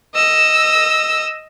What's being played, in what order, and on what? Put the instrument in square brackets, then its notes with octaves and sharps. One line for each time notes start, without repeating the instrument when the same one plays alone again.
[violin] D#5 E6